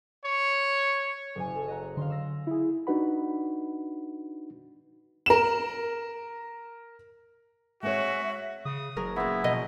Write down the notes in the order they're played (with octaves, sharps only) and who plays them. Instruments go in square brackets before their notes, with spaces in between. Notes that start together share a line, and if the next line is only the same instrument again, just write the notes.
[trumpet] C#5
[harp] F#1 C#3 G#5
A4
D#5 F#5 A#5
[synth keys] D3 [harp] F5 C6
[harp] E6 A#6
[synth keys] E4 G#4
[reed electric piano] D4 D#4 F#4 B4 F#5 B5
[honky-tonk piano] A#4 E7
[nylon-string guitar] G#3 C4 C#5 [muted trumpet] F#4 [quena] E5
[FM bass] C#3 [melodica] D#6
[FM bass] F#1 [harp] F#3 G#4 A#4
[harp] A#2 C#3 [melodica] B3 E4 E5
[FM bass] B2 [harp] F3 A#4 [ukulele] D#5